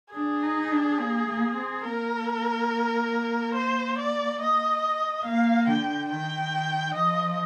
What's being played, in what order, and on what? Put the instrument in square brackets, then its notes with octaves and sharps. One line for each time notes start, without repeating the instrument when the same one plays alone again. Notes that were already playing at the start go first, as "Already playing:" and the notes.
[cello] D4 [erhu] G#4
[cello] D#4
D4
A#3
A#3
C4
[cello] A#3 [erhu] A#4
[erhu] C5
D5
D#5
[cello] A#3 [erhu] F5
[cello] D3 [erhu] G5
[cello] D#3 [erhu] G5
[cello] F3 [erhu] D#5